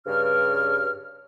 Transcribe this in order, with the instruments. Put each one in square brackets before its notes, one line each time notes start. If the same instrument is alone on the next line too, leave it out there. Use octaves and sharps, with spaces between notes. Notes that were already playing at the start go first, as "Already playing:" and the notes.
[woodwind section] G2 C#3 F6